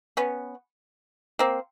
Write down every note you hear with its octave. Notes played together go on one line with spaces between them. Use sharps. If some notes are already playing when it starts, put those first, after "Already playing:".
B3 C#4
A#3 C4